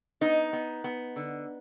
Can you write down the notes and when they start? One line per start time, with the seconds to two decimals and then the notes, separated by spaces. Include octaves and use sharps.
0.21 B3 D#4
0.53 B3
0.84 B3
1.16 D3